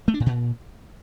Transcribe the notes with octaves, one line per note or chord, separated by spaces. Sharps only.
A3
D4
A2
A#2